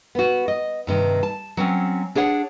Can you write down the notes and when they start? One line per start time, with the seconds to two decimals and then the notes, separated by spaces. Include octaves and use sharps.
0.15 B3 F#4
0.48 D#5
0.87 G2 C3 D#3
1.23 A5
1.57 F#3 C4 C#4
2.15 D4 G#4 C#5 F#5